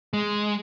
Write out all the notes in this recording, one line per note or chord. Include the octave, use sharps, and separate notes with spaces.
G#3